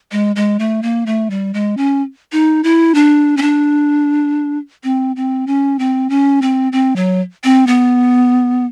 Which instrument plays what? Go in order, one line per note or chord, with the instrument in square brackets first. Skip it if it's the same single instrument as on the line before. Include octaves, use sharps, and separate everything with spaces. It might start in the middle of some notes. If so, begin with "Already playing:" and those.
[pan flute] G#3
G#3
A3
A#3
A3
G3
G#3
C#4
D#4
E4
D4
C#4
D4
C4
C4
C#4
C4
C#4
C4
C4
F#3
C4
B3